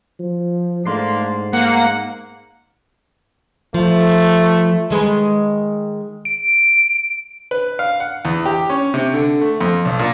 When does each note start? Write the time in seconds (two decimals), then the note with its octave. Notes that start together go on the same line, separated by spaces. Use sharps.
0.20 F3
0.86 G#2 A3 A#3 D4 C6 C7
1.53 A#3 F#5
3.74 F3 A3
4.90 D#3 G#3 B4
6.25 D7
7.51 B4
7.79 F5
8.00 F#5
8.25 E2
8.46 G4
8.70 C#4
8.94 C3
9.14 D3
9.41 A3
9.61 F2
9.85 B1
9.99 A#2